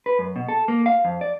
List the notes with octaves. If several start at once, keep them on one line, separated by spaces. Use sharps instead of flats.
B4
F#2
B2
A4
A#3
F5
F2
D5